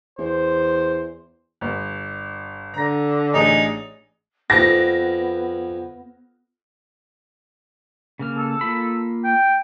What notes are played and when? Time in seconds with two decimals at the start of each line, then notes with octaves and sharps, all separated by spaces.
0.19 E2 C5
1.61 G1
2.74 D3 A#5 A#6
3.34 A1 D4 D#4 G#4
4.50 F2 B3 B4 D6 A#6
8.19 C#3 A#3 F6
8.37 A4
8.61 A#3 F4 B5
9.24 G5